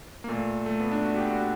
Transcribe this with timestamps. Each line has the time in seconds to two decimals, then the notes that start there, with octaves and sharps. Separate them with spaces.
0.24 A#3
0.28 A#2 A3
0.66 A3
0.80 B3
0.92 D4
1.05 F#4
1.17 G4
1.30 F#4